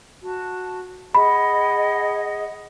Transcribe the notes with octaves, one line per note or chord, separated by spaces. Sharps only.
F#4 A5
G#4 D#5 F#5 B5